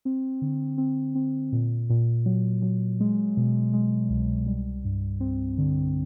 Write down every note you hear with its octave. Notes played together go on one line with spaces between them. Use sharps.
C4
D3
C4
C4
A#2
A#2
F#3
F#3
G#3
B2
G#3
C2
G3
G2
C4
D3